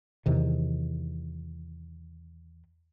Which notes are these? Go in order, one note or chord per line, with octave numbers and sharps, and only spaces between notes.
E2 C3 D#3